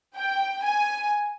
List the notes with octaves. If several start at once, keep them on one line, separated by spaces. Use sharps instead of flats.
G5
G#5